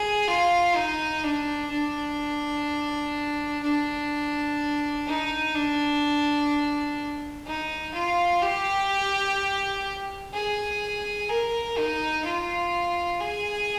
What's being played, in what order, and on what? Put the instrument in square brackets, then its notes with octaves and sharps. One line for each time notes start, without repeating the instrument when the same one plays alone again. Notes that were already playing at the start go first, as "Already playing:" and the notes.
Already playing: [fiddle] G#4
F4
D#4
D4
D4
D4
D#4
D4
D#4
F4
G4
G#4
A#4
D#4
F4
G#4